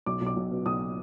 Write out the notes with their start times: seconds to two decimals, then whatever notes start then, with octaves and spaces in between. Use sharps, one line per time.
0.06 B1 D6
0.21 B1
0.26 D6
0.36 B1
0.51 B2
0.66 B1 D#6